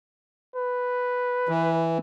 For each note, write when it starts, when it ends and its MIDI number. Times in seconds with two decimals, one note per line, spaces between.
0.56 1.96 71
1.49 1.98 52